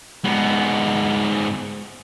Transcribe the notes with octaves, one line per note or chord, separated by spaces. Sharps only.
G#2 B3